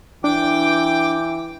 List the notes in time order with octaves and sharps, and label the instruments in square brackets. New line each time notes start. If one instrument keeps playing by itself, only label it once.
[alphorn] E3 [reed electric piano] D4 [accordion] G5 D6